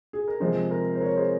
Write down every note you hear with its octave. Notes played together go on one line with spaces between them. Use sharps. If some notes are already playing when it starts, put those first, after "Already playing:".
G#4
A#4
C3 F3 G#3 C4 G#4 C5
A#4
C5
A#4 C#5
G#4 C5